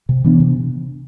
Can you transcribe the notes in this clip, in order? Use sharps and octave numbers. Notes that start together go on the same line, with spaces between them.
C3
E3 B3 D4
C3